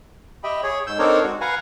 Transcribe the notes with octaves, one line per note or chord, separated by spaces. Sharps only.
G4 D#5 E5 G5 B5
G#4 C#5
G#2 E6 G6
C4 D4 D#4 A4 A#4 C#5
G#3 F#4
B4 F5 F#5 G#5 A#5